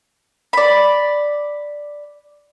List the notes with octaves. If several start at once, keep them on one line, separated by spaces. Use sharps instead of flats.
D5 B5